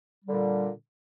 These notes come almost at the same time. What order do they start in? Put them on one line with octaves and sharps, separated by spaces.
G3 D3 A#2